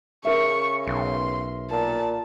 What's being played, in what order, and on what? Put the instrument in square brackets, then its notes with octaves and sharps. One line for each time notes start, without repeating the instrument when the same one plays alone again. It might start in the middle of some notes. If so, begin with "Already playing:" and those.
[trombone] C#3 [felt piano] A#4 E5 [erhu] C#6
[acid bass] B1 [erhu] C6
[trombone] A#2 [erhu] A5